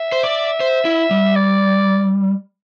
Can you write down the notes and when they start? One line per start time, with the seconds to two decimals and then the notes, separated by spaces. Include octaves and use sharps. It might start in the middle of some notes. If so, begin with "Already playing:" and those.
Already playing: E5
0.12 C5
0.23 D5
0.60 C5
0.85 E4
1.11 G3
1.36 D5